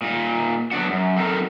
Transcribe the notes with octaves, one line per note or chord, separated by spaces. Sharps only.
A#2 D#4
F#3 B3 D4 F#4
F#2
F#3 C4 D#4 E4 A4 A#4